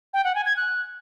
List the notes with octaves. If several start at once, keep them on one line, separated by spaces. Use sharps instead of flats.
G5
F#5
G#5
G#6
F#6